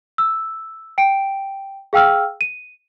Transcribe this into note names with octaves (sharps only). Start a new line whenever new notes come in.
E6
G5 D7
G#4 F5 G5 E6 F6
D#7